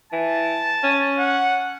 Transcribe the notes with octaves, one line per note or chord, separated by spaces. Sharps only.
E3 A5
C#4
F#5